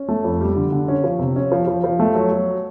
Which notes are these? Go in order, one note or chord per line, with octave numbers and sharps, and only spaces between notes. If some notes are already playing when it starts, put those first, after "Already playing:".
Already playing: C#4
A3
F2
G3
D3
D3
C#4
F3
C3
C#4
F3
F3
F3
A3
F#3
F#3